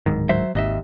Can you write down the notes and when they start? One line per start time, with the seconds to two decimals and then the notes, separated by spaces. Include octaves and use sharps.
0.06 D1 G#2 D#3
0.29 F#3 C5 E5
0.55 G#1 D#2 D#5 E5